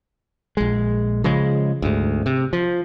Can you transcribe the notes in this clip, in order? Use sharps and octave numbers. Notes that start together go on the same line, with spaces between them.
A#1 G#3
C#3 F3 G#3
D2 G#2
C3
F3